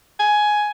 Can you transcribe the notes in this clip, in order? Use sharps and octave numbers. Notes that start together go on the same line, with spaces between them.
G#5